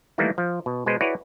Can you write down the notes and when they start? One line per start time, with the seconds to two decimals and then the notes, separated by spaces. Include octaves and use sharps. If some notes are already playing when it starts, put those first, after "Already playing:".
0.18 D#3 E3 G3 A3 A#3
0.38 F3
0.66 B2
0.86 B2 G#3 B4 C5
1.01 E4 F#4 G#4 B4 C#5 D5